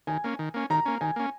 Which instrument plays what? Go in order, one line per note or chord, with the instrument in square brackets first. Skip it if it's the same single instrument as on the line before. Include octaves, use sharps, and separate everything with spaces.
[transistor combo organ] D#3 [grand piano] G#5
[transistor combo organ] A#3 C#4
D#3
A#3 C#4
[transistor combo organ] D#3 [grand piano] A#5
[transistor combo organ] A#3 C#4
[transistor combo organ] D#3 [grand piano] G#5
[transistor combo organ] A#3 C#4